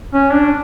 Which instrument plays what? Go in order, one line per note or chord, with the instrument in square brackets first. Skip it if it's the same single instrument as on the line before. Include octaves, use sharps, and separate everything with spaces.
[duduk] C#4
D4